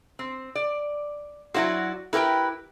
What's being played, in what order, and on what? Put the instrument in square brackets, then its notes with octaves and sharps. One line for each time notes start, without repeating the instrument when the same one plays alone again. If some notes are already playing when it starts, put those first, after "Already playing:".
[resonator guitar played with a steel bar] C4
D5
[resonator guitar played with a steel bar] F#3 E4 F#4 [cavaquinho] C5 D5 F#5
[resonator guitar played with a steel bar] E4 G5 [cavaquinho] G4 A#4 B4